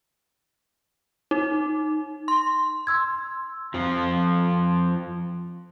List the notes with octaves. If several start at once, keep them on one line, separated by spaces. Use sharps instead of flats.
D#4
C6
C6 E6 G#6
F2 F3